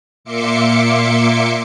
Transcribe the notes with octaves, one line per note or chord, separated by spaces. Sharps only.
A#2 A#3 E5 C6 D6 C#7